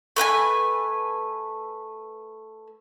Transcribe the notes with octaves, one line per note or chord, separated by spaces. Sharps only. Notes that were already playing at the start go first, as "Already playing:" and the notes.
A3 B4 F#5 G#5